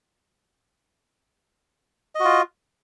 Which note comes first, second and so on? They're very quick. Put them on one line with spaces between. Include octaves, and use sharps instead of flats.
D#5 F#4 F4